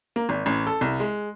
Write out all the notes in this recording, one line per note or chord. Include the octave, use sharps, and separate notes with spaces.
A#3
G#1
A1
A4
C2
G#3